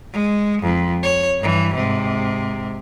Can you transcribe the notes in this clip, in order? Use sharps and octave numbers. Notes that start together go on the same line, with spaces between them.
G#3
F2
C#5
G2 E3
G#2 C3